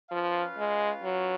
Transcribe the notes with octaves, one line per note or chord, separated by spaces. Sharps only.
F3 C#4 F4 B4 F5
G#3
F#3